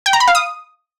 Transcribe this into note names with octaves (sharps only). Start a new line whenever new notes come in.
G5
A#5
B5
F5
D#6